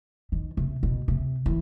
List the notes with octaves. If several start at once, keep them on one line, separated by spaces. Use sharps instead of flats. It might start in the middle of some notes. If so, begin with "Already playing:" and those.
D#3
C3
B2
C3
E3